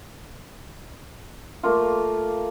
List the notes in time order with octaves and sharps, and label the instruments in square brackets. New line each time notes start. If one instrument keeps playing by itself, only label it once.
[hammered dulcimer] A3 A#3 F4